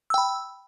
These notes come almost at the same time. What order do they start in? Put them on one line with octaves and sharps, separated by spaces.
E6 G5 B5